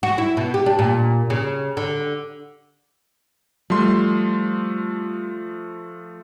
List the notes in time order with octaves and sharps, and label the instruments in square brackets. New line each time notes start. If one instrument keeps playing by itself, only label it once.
[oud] F#4
E4
B2
G4
D4
A#2
C#3
D3
[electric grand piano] F3 A3 C6 [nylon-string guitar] G3